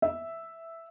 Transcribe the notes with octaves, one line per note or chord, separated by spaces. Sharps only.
E5